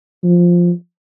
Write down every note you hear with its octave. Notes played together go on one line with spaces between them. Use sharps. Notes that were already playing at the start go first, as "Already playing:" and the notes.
F3